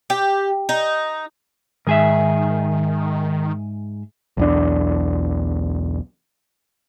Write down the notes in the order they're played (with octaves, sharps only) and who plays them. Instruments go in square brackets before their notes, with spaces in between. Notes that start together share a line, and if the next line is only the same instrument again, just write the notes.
[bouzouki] G4
D#4
[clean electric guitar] G#2 G#4 E5 [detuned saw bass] D#3
[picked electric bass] B1 E2 D4